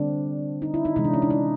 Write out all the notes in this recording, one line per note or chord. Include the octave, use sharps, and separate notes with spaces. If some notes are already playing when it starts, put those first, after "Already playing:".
Already playing: D3 G3 C4 D4
D#4
E4
D#4
C3 E3 G#3 D#4
D4
C#4
D4
D#4